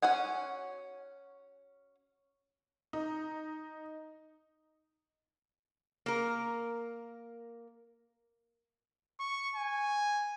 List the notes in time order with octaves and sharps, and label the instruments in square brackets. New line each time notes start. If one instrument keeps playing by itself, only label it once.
[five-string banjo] C#4 F#4 F#5 G#5
[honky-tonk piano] D#4
[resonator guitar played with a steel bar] A#3 A#4
[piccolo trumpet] C#6
G#5